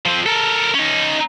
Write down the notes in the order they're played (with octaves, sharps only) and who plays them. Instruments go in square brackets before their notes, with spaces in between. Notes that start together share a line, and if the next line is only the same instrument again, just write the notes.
[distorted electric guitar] F3 C4
A4 A#4
C#4 D#4